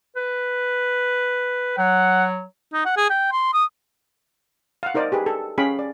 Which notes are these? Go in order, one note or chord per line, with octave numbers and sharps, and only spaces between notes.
B4
F#3 F#5
D#4
F#5
G#4
G5
C6
D#6
F5 F#5
D#4 A#4 C5 D5 D#5
G4 G#4 B4
A4
C#4 G#4 F5 G5 B5
D5